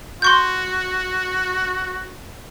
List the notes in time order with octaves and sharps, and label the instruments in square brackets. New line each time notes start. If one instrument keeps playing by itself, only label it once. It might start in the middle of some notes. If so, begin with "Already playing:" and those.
[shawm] F#4 [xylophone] C6 C#6 G6